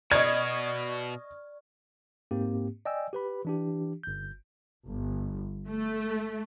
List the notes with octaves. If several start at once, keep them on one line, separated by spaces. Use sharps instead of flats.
B2 D5 D#5 C#6 F6 G#6
G#2 A#3 C4 G4
D5 D#5 G5 G#5 E6
G4 B4 B5
E3 D4 G4
G1 G6
G1
A3